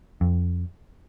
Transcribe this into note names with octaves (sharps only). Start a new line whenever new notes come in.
F2